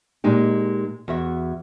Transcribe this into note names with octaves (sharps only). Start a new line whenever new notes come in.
A#2 G#3 D#4 G4
E2 F#4 E5